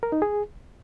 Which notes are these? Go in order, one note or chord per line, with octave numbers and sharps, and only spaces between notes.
A#4
D#4
G#4